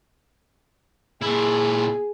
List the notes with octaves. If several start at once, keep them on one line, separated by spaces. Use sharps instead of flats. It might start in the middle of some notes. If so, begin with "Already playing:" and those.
A#2 E4 G#4